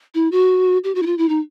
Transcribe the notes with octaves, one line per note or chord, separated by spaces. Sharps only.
E4
F#4
G4
F#4
E4
F4
E4
D#4